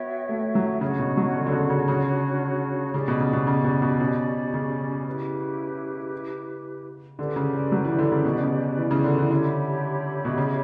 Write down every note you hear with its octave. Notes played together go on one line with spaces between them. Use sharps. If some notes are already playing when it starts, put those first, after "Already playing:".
Already playing: B3 F#4 C#5 E5 G5
A3
F#3
C#3 D4 F#4 C#5
B2
F#3
D3
D3
C#3
C#3
C#3
C#3 C#4 G4 D5
B2
C#3
B2
C#3
B2
B2
B2
C#3
E4 G4 B4
D3 C#4 G4 B4 D5
C#3
D3
F#3
E3
D3
C#3
B2
C#3
E3
C#3
D3
E3
D3 G4 C#5 E5 B5
B2
C#3